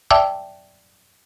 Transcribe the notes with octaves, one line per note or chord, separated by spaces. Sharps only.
D5 E5 G5 A5 D6 E6